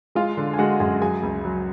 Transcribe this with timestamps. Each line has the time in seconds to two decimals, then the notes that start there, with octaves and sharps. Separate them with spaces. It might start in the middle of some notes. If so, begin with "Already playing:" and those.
0.15 G#3 F4 F5
0.37 D3
0.53 G#5
0.58 G#3 F#4 F#5
0.80 F#2 G#4 G#5
1.01 F#3 G#4 G#5
1.23 C#2
1.45 F#3